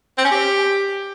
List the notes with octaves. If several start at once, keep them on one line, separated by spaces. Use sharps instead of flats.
C4
C#4
G4